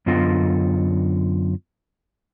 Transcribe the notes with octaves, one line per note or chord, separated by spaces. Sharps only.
F#2 D3 B3 F4 D#5